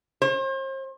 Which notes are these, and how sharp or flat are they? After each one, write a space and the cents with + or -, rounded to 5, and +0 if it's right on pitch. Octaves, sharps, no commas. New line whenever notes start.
C5 +40